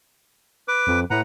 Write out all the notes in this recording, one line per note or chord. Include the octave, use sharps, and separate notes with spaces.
B4 D6
F2
A2 B4 F#5 A#5